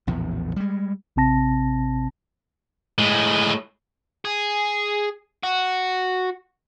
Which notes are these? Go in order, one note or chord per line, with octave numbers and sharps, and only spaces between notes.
A#1 E2 A2
G3 G#3
A1 C3 C4 A5 A#6
A2 G#3
G#4
F#4